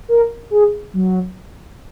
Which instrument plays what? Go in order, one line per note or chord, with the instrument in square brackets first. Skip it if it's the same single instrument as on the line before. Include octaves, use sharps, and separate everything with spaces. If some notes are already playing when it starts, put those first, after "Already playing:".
[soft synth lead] A#4
G#4
F#3